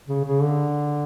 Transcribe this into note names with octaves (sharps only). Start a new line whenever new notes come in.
C#3
C#3
D3